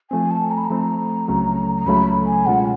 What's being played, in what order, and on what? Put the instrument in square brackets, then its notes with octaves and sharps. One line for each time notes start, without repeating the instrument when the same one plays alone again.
[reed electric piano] F3 A3 C4 [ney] G#5
[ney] A5
A#5
B5
A#5
[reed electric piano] F3 A3 C4
C#2 C#3 F#3 A3 C#4
[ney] A#5
[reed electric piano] C#2 C#3 F#3 A3 C#4 [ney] B5
[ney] G#5
[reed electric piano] B2 G#3 C#4 F4 [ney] F#5